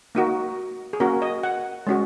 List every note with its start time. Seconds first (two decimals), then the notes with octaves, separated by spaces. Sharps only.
0.15 A#3 D#4 F#4
0.93 G#4
1.00 A#3 C#4 F#4 A#4
1.22 D#5
1.43 F#5
1.87 G#3 C#4 F#4